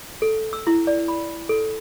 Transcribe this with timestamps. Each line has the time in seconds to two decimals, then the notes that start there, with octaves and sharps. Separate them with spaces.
0.22 A4
0.53 E6
0.67 E4
0.87 D5
1.08 B5
1.49 A4